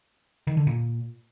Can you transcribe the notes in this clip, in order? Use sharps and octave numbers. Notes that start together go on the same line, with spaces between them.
D#3
D3
A#2